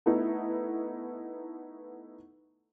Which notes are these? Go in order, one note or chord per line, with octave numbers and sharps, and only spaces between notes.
A3 B3 D#4 E4